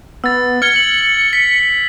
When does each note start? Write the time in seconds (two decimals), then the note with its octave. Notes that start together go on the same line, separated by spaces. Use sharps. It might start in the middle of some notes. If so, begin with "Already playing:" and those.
0.24 B3 E6 A6
0.62 F6 G#6 C#7 G7
0.76 F#7
1.33 B6